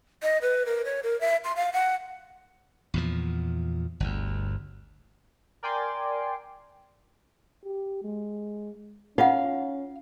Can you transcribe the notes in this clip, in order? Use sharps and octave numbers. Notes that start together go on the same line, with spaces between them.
D#5
B4
A#4
C#5
A#4
E5
C6
F5
F#5
E2 A#2 F3
G1 D2
A#4 D5 G5 G#5 C6 D6
G4
G#3
C#4 D#4 F4 F5 F#5